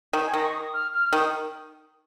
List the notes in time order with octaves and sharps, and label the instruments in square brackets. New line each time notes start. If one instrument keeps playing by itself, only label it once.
[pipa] D#3
[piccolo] G#5
[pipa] D#3 [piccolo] A#5
[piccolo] C#6
D#6
F6
F6
[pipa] D#3 [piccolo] D#6